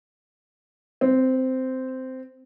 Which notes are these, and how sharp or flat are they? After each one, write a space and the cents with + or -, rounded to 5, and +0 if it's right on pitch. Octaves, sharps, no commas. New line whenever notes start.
C4 -10